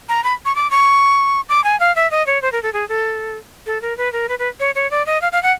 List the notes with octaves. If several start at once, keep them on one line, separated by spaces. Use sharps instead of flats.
A#5
B5
C#6
D6
C#6
D6
G#5
F5
E5
D#5
C#5
C5
A#4
A4
G#4
A4
A4
A#4
B4
A#4
B4
B4
C#5
C#5
D5
D#5
F5
F5
F#5